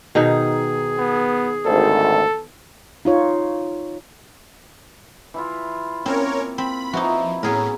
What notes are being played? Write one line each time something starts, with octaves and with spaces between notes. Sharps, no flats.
B2 D#3 D#4 G#4
B3
G#1 D2 A4
D#4 F4 C#5
E3 E4 F4
A#3 C4 C#4 A#4 C#5
C4 B5
E3 F3 D#4 E4 F#4 A#5
A2 B3 C#4 G#4 A#4